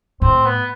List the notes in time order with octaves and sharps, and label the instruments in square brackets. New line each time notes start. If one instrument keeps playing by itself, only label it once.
[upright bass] A2 [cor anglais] C4
[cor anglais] B3